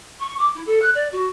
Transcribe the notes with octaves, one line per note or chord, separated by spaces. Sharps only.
C#6
D6
E4
A4
F#6
D5
F#4